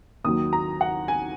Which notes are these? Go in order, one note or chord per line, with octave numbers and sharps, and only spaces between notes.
D#2 D#3 F#3 D#6
A#5
F#5
G#5